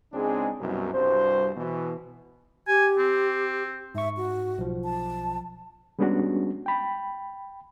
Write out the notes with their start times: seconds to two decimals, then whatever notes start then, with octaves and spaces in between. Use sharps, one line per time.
0.13 C#2 G#3 C4 D4 D#4 G#4
0.60 C2 F#2 B2
0.94 C2 G2 F#4 C5
1.57 B2 E3
2.68 G4 G#5
2.99 C4
3.95 G#2 E5 C#6
4.17 F#4
4.58 B1 F3
4.84 A5
5.99 G3 G#3 B3 C#4 D4 F#4
6.66 G5 B5